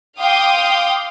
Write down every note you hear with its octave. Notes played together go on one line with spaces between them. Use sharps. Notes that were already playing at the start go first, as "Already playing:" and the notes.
F5 G5 C6 D6 D#6